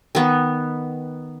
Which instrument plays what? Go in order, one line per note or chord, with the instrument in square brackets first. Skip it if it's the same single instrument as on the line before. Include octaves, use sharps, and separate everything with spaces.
[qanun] D#3 B3